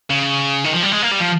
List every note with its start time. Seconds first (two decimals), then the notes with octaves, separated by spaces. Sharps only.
0.10 C#3
0.65 D#3
0.74 F3
0.83 G3
0.92 G#3
1.02 A#3
1.11 G3
1.20 F3